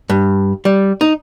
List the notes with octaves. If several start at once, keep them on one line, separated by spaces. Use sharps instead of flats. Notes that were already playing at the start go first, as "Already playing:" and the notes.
G2
G3
D#4